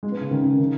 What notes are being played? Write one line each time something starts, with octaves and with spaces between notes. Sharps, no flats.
G#3
B3
C#3
D#3
C#3
D#3